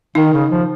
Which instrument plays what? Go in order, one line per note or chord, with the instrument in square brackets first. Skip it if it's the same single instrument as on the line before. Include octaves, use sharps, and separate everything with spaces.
[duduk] D#3 [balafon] D#4
[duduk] C#3
F3